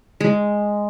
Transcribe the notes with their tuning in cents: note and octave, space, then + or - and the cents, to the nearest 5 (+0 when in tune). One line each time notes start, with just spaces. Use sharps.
G#3 -5